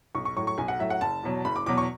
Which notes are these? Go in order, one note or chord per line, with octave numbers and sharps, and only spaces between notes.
B1 C#6
C#6
A2 F#3 C#6
C#6
B1 G#5
F#5
A2 F#3 E5
F#5
F#1 A5
E2 B2 F#3
F#1 B5
D6
E2 B2 F#3 D6
C#6